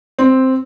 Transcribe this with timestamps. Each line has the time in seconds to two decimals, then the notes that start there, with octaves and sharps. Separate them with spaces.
0.19 C4